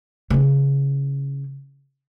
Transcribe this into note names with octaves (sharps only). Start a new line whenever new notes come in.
C#3 E3